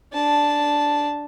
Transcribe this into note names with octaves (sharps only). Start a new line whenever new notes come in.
D4 A5